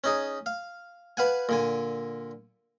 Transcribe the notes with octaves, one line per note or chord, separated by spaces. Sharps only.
C#4 D#4 G#4
F5
B4 F5 F#5 G#5
A#2 D3 G#5